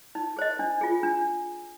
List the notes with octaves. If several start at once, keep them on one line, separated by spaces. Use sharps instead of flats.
D#4
G#4 C5 D#5
D4
F4 G#4
D4